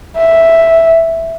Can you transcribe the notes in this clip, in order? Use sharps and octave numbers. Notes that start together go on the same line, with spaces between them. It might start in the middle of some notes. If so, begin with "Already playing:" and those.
E5